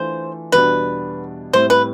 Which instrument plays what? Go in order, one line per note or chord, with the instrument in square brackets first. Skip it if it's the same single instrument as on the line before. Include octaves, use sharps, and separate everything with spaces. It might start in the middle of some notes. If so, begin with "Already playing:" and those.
Already playing: [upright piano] E3 A3 D4 F4 [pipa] C5
[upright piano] E2 B2 G3 B3 D4 [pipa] B4
[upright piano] A2 G3 C4 E4 [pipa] C5
[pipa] B4